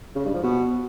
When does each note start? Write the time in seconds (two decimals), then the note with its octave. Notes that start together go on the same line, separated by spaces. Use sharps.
0.16 C#3
0.25 G2
0.34 F3
0.43 B2